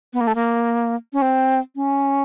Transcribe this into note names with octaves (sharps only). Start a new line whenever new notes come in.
B3
A#3
A3
A#3
C#4
C4
C#4